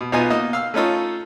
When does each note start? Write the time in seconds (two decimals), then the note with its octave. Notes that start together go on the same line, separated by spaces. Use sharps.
0.01 B2
0.12 B1 B2 B3 D#4 F4 G#5
0.30 A#3 D#4 D#5
0.53 F5 E6 F6
0.74 A3 C#4 D#4 F4 A4